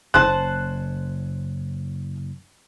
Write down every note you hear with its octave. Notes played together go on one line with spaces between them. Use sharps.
F#1 C#4 C5 A5 F#6